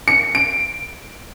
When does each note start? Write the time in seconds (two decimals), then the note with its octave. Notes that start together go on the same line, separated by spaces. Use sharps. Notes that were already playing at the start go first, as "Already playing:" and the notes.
0.08 C#7
0.35 D7